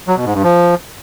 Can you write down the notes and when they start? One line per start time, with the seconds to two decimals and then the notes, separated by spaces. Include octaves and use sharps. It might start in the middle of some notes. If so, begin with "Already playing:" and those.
0.07 F#3
0.16 B2
0.25 G#2
0.34 G2
0.43 F3